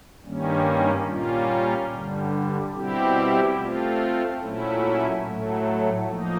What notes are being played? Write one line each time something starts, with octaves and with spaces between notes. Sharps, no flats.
G2 D#3 G3 A#3 C#4
A#2 G3 A#3 C#4 F4
G2 D3 G3
B2 G3 C4 E4 G4
A3 C4 F4
A#2 F#3 A3 C#4 E4
A2 F#3 A3
F3 A#3 D#4